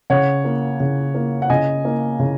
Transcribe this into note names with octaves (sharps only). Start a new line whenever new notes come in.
C#3 C#5 F#5
A#3
C#3
A#3
F#5
C#3 D#5 G#5
A#3
C#3